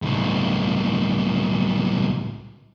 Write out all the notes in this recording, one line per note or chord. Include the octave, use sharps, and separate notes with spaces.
C#2 A2